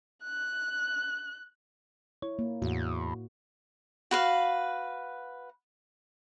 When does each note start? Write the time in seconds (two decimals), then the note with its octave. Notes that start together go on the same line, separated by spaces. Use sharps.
0.23 F#6
2.22 E4 C#5
2.39 A#3
2.62 E2 A2 F#4
4.11 F#4 B4 F5